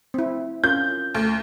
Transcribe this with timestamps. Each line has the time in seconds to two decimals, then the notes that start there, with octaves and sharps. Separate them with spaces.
0.14 C4 E4
0.64 C#4 F4 A#4 G6
1.15 D2